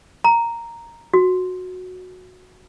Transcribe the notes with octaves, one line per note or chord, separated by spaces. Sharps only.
A#5
F#4